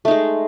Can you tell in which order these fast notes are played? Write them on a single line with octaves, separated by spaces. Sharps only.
A3 D#4 G#3